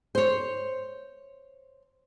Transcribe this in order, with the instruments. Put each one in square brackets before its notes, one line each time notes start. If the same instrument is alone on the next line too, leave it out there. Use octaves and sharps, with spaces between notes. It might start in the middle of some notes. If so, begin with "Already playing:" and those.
[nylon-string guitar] C5 C#5